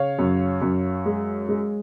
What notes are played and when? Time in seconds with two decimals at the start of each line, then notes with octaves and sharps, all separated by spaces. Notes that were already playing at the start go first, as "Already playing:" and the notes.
Already playing: C#3 C#5 F5
0.19 F#2
0.62 F#2
1.06 G#3
1.49 G#3